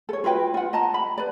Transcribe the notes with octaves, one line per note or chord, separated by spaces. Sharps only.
A4 C#5
F4 F#4 B4 G5
F4 F#5
D#5 A5 A#5
B5
B4 D5